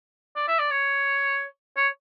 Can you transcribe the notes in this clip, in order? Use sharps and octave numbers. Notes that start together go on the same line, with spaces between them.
D5
E5
D5
C#5
C#5